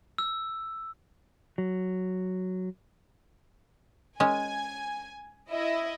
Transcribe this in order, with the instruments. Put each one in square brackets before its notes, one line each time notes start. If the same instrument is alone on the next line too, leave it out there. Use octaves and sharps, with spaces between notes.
[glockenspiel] E6
[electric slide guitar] F#3
[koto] G#3 C#4 [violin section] G#5
[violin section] E4 D#5 E5